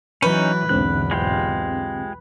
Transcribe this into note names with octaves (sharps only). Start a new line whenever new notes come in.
E3 F#3 C#4 D#4 B4 G6
B1 E2 G#2 D3 C4 F#6
G#3 F4 G4